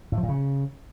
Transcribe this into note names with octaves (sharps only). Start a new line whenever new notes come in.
A2
F3
A#2
C#3